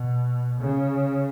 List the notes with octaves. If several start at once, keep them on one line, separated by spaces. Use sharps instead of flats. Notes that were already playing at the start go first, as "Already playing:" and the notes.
Already playing: B2
C#3